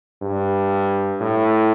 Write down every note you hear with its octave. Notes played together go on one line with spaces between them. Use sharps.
G2
A2